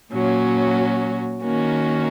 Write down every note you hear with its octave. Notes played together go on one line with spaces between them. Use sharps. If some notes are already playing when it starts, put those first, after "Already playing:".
A#2 F#3 C#4 F#4
D#3 A#3 C#4 F#4